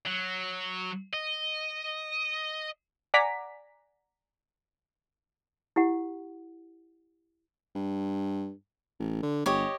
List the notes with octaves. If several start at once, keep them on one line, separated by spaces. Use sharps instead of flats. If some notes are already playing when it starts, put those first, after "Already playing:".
F#3
D#5
D5 F#5 G#5 A#5 D6 B6
E4 G4 F#5
G2
A1
D3
G1 G4 C#5 D#5